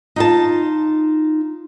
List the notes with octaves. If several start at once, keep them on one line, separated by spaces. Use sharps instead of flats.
D#4 F4 A5